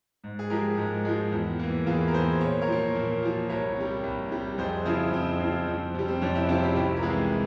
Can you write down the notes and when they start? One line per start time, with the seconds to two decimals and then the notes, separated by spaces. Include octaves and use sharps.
0.24 G#2
0.39 G#4
0.50 F3 G#3 G4 A#4
0.78 G#2
1.05 F3 G#3
1.32 E2
1.59 E3 A#3
1.87 E2 F4 G#4
2.08 A#4
2.13 E3 A#3 G#4 C5
2.41 A#2 C#5
2.62 A#4 C#5
2.68 F3 A#3
2.95 A#2
3.22 F3 A#3
3.49 C2 A#4 C#5
3.77 C3 G3
4.03 C2
4.31 C3 G3
4.58 F2 G#4 C5
4.85 C#3 F3 C4 E4
5.13 F2 C4
5.40 C#3 F3
5.67 F2
5.94 C3 G3
6.08 C4
6.21 F2 C#4
6.35 C4 E4
6.49 C3 G3 C#4 F4
6.63 E4 G4
6.75 C2 E4 G4
6.97 A#4
7.02 C3 E3 G#3 F4 G#4